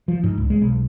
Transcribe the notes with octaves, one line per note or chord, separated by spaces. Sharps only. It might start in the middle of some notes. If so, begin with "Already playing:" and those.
F3
G#2
C#2
G#3
B1